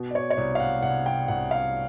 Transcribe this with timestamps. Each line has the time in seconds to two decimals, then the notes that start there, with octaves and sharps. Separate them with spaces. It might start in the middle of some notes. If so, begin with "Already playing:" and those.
Already playing: B2
0.11 D5
0.15 C#5
0.30 C#5
0.37 C2 D5
0.55 F5
0.60 F#5
0.82 C2 F#5
1.06 G5
1.28 C2 F#5
1.51 F5